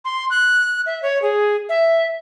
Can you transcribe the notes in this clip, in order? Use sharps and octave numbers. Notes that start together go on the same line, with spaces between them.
C6
F#6
E5
C#5
G#4
E5